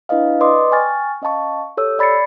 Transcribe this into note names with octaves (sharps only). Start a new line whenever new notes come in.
D4 E4 B4 D#5 F5
B4 D5 D#5 C6 D6 D#6
G5 G#5 C#6 F6 A6
C#4 D#5 F5 A5 C#6
G4 A4 C#5 E6
D5 B5 A6 C7 C#7